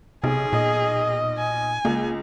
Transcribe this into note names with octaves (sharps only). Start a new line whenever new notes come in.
B1 C3 G#4
A#2 D#5
G#5
C#2 A#3